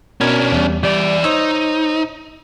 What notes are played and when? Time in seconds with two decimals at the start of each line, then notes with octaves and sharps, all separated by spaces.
0.21 B2 C#4 D4 A#4 G#6
0.52 E2 G3
0.83 E3 G3 D5
1.24 D#4 C5 C#5 E6